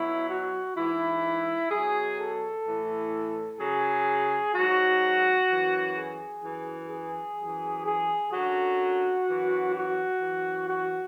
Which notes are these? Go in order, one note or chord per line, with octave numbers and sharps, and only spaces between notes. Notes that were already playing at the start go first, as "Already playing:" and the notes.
Already playing: B2 F#3 E4
F#4
G#2 E3 E4
B2 F#3 G#4
A4
A2 E3
F#2 C#3 F#3 G#4
G#2 F#3 F#4
F#2 E3
G#4
F#2 E3
G#4
F#2 E3
G#4
F#2 D3 F#3 F#4
F#2 E3
F#4
F#2 E3
F#4